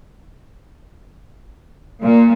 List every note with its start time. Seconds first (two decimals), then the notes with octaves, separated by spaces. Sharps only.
2.03 A#2